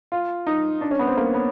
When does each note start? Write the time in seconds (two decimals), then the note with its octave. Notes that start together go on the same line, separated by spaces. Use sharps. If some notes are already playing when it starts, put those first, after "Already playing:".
0.12 F4
0.47 D#4
0.81 D4
0.91 C#4
0.99 B3
1.07 C4
1.17 A#3
1.34 B3